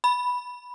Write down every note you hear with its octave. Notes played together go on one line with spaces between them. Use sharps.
B5